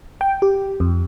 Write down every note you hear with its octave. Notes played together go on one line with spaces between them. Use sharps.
G5
G4
F2